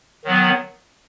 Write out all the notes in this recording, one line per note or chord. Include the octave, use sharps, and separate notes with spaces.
D#3 F#3 B3